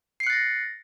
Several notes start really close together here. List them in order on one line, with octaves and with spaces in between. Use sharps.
C7 C#7 F#6 A6 A#6